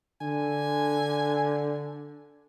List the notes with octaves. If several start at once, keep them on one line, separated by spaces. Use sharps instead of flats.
D3 G#5